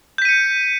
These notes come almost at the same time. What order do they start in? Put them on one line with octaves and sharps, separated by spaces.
G6 B6 D#7 C#7